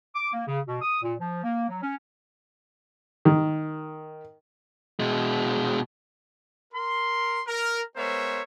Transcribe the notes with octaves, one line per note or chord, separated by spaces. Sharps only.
D6
A#3
C#3
B2
D#6
A#2
F3
A#3
F#3
C#4
D#3
B2 G#3
A#4 C6
A#4
G#3 B3 A#4 C5 C#5 E5